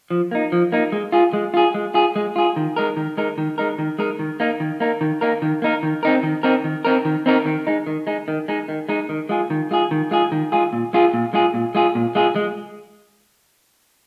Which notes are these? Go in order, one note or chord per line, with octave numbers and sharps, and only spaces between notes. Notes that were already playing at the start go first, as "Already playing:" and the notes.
F3
A#3 D#4
F3
A#3 D#4
G#3
F4 G#4
G#3
F4 G#4
G#3
F4 G#4
G#3
F4 G#4
D#3
G#3 D#4 A#4
D#3
G#3 D#4 A#4
D#3
G#3 D#4 A#4
D#3
G#3 D#4 A#4
D#3
A#3 D#4 A#4
D#3
A#3 D#4 A#4
D#3
A#3 D#4 A#4
D#3
A#3 D#4 A#4
D#3
C4 D#4 A#4
D#3
C4 D#4 A#4
D#3
C4 D#4 A#4
D#3
C4 D#4 A#4
D#3
G#3 D#4
D#3
G#3 D#4
D#3
G#3 D#4
D#3
G#3 D#4
D#3
G#3 F4 G#4
D#3
G#3 F4 G#4
D#3
G#3 F4 G#4
D#3
G#3 F4 G#4
A#2
G#3 F4 G#4
A#2
G#3 F4 G#4
A#2
G#3 F4 G#4
A#2
G#3 F4 G#4
G#3